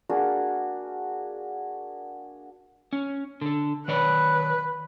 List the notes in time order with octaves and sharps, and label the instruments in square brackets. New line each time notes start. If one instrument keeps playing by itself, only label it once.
[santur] A#3 D4 F#4 G#4
[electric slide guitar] C#4
D3 A4
[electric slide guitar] D#3 C#5 D5 [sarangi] B4